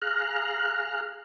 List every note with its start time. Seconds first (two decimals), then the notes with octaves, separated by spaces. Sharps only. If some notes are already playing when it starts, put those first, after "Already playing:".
0.02 G#4 F5 A#5 F6 F#6